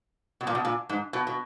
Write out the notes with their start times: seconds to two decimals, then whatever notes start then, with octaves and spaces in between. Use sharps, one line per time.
0.41 B2
0.47 A#2
0.55 B2
0.65 A#2
0.89 G#2
1.13 B2
1.27 B2